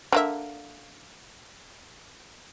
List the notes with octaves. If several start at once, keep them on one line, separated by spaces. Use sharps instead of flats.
D3 A#3 E5